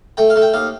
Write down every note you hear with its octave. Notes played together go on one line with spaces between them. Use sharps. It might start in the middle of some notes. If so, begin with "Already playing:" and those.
A3 G5
F5
A3
G5
D#2 F5